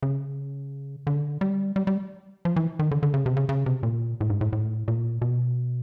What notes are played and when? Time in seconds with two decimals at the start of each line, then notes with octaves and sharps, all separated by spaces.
0.03 C#3
1.07 D3
1.41 G3
1.76 G3
1.87 G3
2.45 F3
2.56 E3
2.79 D#3
2.91 D3
3.03 D3
3.14 C#3
3.26 C3
3.37 C#3
3.49 C#3
3.66 C3
3.83 A#2
4.21 A2
4.30 G#2
4.41 A2
4.53 A2
4.88 A#2
5.22 B2